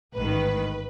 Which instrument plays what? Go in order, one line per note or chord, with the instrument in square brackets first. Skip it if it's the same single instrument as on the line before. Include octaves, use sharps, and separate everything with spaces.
[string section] A1 G#2 D#3 B4